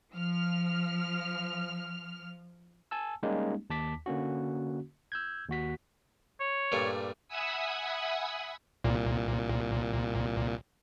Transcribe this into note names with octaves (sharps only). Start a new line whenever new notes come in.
F3 F6
G#5 A5 E6
G3 G#3 A#3 C#4 D#4 G4
D#2 A5 D6 B6
D3 A#3 C#4 F#4
E6 G6 G#6
D#2 F#4 B6
C#5
G2 A#2 A3
E5 F#5 G#5 B5 D#6 E6
C2 A#2